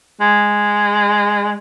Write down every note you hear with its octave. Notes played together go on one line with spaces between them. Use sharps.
G#3